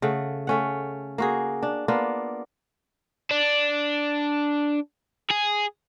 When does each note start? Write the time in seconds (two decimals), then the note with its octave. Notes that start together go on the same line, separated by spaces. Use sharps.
0.02 C#3 A3 F#5
0.47 A3 C#4 F#5
1.18 A#3 F#4 G#4
1.63 D4
1.88 A#3 B3 D4 F4
3.31 D4
5.31 G#4